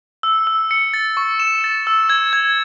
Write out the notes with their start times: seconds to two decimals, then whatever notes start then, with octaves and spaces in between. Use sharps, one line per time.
0.23 E6
0.47 E6
0.71 C#7
0.94 A6
1.17 C#6
1.40 E7
1.64 A6
1.87 E6
2.10 G#6
2.33 G#6